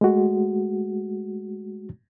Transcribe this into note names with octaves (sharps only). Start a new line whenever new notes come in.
G#3 A3 F#4